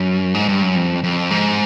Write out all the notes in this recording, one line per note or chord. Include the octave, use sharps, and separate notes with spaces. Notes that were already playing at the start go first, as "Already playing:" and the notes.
Already playing: F#2
G#2
G2
F#2
F2
F2
G#2